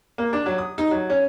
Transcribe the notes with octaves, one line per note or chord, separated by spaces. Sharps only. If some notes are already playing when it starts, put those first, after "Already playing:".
A#3
D4
F#3
D#6
D#4
F#3
C#4